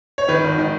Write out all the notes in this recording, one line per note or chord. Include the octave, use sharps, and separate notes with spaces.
C#5
D#3 B4
G#1
D#3